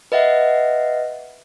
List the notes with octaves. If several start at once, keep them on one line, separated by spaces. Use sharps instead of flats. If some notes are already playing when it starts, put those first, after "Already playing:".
B4 D#5 E5 F#5